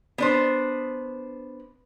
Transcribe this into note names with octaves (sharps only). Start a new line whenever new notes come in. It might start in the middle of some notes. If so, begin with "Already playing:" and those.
B3 D4 C5